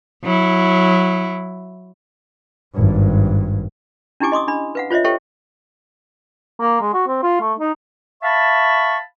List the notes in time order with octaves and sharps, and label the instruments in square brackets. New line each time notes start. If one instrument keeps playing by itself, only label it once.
[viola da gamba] F#3 E4
[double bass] G#1 G2
[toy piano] C#4 D4 E4 G4 G#5 D6
D#5 C6 D6 D#6
D4 B5
B4 F5 F#5
F4 C5 C#5 D#5 E5
G4 A4 C5 C#5 E5 G5
[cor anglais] A#3
G#3
F#4
C4
F4
A3
D#4
[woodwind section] E5 F5 A5 B5 C#6